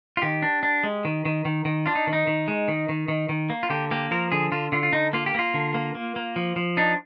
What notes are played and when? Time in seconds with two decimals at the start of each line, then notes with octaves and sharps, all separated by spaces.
0.17 F4
0.22 D#3 G4
0.42 D4
0.63 D4
0.84 G#3
1.05 D#3
1.25 D#3
1.45 D#3
1.65 D#3
1.86 D4 F4
1.95 D#4
2.07 D#3
2.13 D#4
2.27 D#3
2.48 G#3
2.68 D#3
2.89 D#3
3.08 D#3
3.29 D#3
3.50 A#3
3.63 F4
3.70 D3 G4
3.91 A#3 G4
4.11 F3 A#4
4.32 D3 G#4
4.52 D3 F4
4.72 D3 F4
4.83 F4
4.93 D3 D#4
5.13 A#3 F4
5.26 G4
5.35 A#3 F4
5.54 D3
5.74 A#3
5.95 A#3
6.16 A#3
6.36 F3
6.56 F3
6.77 D4 D#4